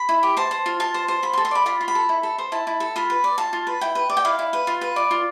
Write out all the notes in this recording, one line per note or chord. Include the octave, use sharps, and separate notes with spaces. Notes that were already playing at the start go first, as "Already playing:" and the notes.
Already playing: B5
E4
G4
C5 A5
C5
F4
F4 A5
C5
C5
F4 B5
C6
A4
C6
D5 B5
F4 B5
F4
B5
A4
E4
A4
C5
E4 A5
E4
A4
F4 B5
B4
D5
F4 A5
F4
B4
E4 G5
B4
D5
G5
E4 F5
E4
B4
F4
B4
D5
F4